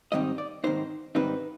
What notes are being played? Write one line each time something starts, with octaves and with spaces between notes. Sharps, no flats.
G#2 D#3 G3 C4 D#4 D#5
D5
G#2 D#3 G3 C4 D#4 C5
G#2 D#3 G3 C4 D#4 B4